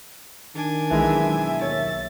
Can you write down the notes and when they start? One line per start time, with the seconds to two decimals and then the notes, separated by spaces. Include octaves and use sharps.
0.55 D#3 D4 G#5
0.90 B1 E3 G#3 E5
1.61 D#2 C#5 A6